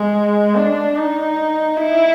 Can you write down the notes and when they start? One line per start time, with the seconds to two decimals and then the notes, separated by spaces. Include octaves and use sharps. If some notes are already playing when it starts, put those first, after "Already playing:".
Already playing: G#3
0.56 D4
0.97 D#4
1.77 E4